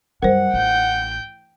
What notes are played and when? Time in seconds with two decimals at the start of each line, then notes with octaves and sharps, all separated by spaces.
0.23 F#2 G3 A#4 C5 F#5
0.54 A1 G5 G6